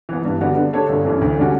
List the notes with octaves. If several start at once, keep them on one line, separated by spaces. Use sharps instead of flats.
E3 B3
G2
D3 G3 B3 F#4
D3
A3 D4 A4 C#5
G1
F#2 E3 A3 C#4
D2
D3 G3 C#4 F#4